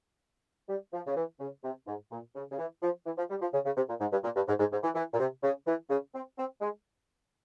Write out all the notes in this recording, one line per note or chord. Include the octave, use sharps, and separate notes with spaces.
G3
F3
C#3
E3
C#3
C3
G#2
A#2
C#3
C#3
E3
F3
E3
F3
G3
F3
C#3
C#3
C3
A#2
G#2
G2
A#2
G2
G#2
G#2
G#2
E3
E3
A#2
C3
C#3
E3
C#3
C4
C4
G#3